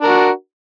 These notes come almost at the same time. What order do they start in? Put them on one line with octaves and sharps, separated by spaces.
D4 A#4 F#4